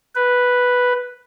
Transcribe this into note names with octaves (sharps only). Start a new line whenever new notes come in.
B4